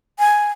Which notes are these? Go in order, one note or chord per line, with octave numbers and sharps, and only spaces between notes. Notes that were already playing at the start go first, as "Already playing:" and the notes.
G#5